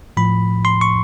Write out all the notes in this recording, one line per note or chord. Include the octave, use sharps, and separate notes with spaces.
A2 F3 B5
C6
C#6